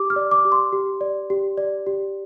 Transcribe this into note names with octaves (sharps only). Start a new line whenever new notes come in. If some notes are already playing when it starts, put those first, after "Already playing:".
Already playing: G4 D6
F6
D5
D6
G4
C6
G4
D5
G4
D5
G4